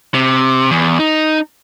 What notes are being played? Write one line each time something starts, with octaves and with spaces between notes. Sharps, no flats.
C3
E2
D#4